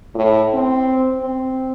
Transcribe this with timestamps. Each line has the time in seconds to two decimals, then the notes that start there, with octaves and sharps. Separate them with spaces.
0.15 A2
0.54 C4
1.21 C4